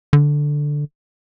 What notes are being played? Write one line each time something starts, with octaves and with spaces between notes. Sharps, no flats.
D3